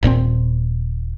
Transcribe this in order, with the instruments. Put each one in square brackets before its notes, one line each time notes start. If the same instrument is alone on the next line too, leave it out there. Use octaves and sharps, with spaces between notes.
[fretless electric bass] D#1 A#2 B3 C4